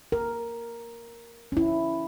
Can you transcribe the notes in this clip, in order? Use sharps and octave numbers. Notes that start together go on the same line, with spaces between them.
A#4
C#4 E4